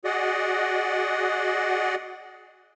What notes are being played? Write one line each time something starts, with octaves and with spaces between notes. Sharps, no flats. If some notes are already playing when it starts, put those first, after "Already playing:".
F#4 G#4 D5 D#5 F#5